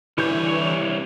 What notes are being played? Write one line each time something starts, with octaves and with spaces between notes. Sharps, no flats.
C2 D3 E3 E4 G4 C#5 G6